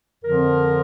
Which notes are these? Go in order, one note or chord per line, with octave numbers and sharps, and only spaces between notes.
F2 D3 F3 A#4